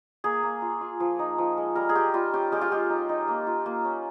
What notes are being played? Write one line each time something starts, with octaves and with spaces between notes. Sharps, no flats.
A#3 G#4
A#3
F4
F4
F3
D#4
F3
G#3
G3 A#4
G#4
F4 G4
G3 F4
C#4 G4
G#3 G4
F4
G#3 G4
D#4
D#4
A#3
F4
A#3
C#4